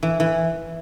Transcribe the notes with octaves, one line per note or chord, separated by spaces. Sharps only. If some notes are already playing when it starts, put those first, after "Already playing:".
E3
E3